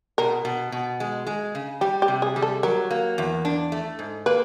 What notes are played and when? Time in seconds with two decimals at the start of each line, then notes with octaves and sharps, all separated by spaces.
0.18 B2 A#4
0.45 B2
0.72 B2
1.00 G#3
1.27 G#3
1.55 C#3
1.81 G3 G4
2.02 G4
2.08 C3
2.22 G#4
2.36 G3
2.42 A4
2.63 F#3 A#4
2.90 A#3
3.18 E2
3.45 D4
3.72 A3
3.99 G#2
4.26 A#3 B4